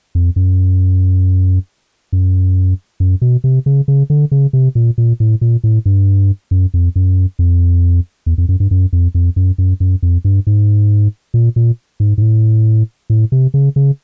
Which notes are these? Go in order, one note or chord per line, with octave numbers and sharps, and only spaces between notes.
F2
F#2
F#2
F#2
B2
C3
C#3
C#3
D3
C#3
C3
A#2
A#2
A2
A#2
A2
G2
F#2
F2
F#2
F2
E2
F2
F#2
G2
F#2
F2
F2
F#2
F#2
F#2
F2
G2
G#2
A#2
A#2
G#2
G#2
A2
A2
C3
C#3
C#3